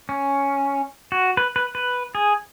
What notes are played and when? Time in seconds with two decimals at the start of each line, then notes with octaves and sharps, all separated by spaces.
0.09 C#4
1.12 F#4
1.37 B4
1.56 B4
1.75 B4
2.15 G#4